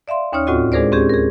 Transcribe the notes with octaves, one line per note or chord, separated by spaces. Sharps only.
D5 E5 F5 C6
D#2 C#4 D#4 C#5 F6
D2 A2 C4 F4 F#4 D#5
G#3 D4 G#4 A#4 C5 D5
C4 C#4 G4 G#4
G#4 A#4